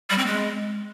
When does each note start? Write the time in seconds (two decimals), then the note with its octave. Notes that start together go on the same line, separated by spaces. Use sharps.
0.10 G3
0.18 C4
0.27 G#3